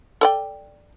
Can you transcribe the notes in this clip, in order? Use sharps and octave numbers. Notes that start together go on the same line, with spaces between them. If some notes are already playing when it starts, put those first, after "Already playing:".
A4 D5 G5